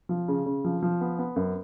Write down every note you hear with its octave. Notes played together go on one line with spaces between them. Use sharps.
F3
C#3
C#3
F3
F3
B3
B3
F#2